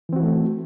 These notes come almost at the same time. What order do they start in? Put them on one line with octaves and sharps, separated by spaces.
E3 C4 F#4 E4 A3